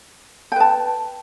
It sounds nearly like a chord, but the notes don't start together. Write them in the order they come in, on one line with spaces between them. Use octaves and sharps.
G5 B4 A5